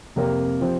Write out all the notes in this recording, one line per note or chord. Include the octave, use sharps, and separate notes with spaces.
F2 C3 A#3 G4 A#4
F3 C4 G4